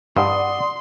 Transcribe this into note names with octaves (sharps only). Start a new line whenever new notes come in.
G2 D5 F#5 C6 D#6